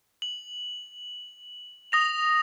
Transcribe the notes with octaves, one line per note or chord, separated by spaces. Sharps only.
F#7
D#6 A#6 F7